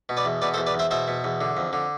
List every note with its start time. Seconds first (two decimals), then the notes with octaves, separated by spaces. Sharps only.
0.09 B2
0.17 B4 D5
0.25 E2
0.42 B2 B4 D5
0.54 A4 C5
0.58 E2
0.67 B4 D5
0.74 E2 C5 E5
0.91 B2 C5 E5
1.08 B2
1.24 E2
1.41 D3
1.57 F2
1.73 D3